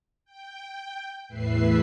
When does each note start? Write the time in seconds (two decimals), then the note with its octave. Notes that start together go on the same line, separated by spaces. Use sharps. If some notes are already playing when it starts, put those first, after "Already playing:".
0.25 G5
1.28 E2 A2 B4 E5 C7